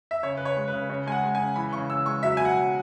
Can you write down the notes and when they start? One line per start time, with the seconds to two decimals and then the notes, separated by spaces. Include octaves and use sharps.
0.11 E5
0.23 C#3 C#5
0.37 B4
0.40 C#3
0.45 C#5
0.56 G#3
0.68 B4
0.73 C#3
0.90 C#3 C#5
1.07 G#3 G#5
1.12 F#5
1.23 G#3
1.35 G#5
1.40 C#3
1.56 E3 B5
1.73 C#3 C#6
1.90 C#3 E6
2.06 G#3 C#6
2.23 F#3 E5
2.37 B2 G#5
2.45 F#5
2.57 F#3